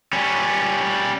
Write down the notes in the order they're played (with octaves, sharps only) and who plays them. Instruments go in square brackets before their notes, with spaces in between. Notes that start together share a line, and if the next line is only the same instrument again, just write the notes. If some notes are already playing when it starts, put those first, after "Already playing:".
[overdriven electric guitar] G3 C#4